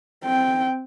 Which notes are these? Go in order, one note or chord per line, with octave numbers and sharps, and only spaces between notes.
C4 G5